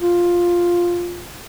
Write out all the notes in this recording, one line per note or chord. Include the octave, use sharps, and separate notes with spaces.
F4